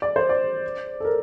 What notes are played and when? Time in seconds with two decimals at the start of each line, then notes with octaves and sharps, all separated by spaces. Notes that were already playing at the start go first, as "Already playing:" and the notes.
0.02 D5
0.16 C5
0.29 D5
1.00 A4
1.05 A#4